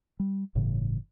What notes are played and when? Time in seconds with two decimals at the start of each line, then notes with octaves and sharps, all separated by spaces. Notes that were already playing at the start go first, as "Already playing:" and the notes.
0.20 G3
0.55 G1 A2 C#3 E3